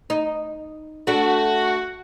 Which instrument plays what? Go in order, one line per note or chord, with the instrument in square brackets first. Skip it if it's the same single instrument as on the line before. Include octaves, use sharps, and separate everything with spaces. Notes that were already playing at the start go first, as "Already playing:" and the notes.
[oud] D#4
[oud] A3 D4 [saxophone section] F#4